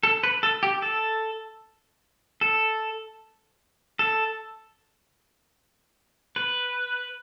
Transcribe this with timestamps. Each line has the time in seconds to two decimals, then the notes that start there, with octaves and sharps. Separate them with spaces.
0.03 A4
0.24 B4
0.43 A4
0.63 G4
0.82 A4
2.41 A4
3.99 A4
6.36 B4